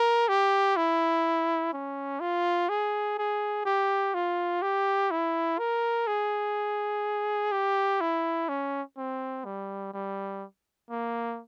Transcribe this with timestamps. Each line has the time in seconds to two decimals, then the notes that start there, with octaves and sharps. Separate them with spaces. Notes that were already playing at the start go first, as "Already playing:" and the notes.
Already playing: A#4
0.29 G4
0.77 E4
1.73 C#4
2.21 F4
2.69 G#4
3.18 G#4
3.66 G4
4.15 F4
4.62 G4
5.11 E4
5.59 A#4
6.08 G#4
7.52 G4
8.01 E4
8.49 C#4
8.98 C4
9.45 G3
9.94 G3
10.91 A#3